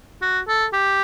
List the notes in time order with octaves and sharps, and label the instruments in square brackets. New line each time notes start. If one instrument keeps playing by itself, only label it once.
[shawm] F#4
A4
G4